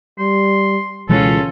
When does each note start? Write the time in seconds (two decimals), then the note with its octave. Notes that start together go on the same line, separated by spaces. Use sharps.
0.19 G3 C6
1.09 C#2 B2 E3 G#3 C#4 F4 A4